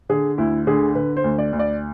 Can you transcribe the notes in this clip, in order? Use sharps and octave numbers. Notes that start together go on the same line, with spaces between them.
D3 G#4
D2 E4
D3 G#4
D3 B4
C5
D2
D5
D2
D5